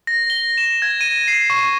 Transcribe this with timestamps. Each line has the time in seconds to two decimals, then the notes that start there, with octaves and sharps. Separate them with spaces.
0.07 A#6
0.30 G7
0.58 E7
0.82 G#6
1.01 D#7
1.28 C7
1.50 C#6